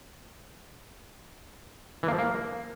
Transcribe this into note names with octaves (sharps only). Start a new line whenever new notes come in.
E3
A#3
F3
A#3